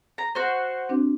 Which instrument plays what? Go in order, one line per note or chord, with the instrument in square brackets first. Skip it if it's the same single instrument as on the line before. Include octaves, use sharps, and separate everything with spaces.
[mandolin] A#5
F#4 C5
[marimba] C4 D4 F#4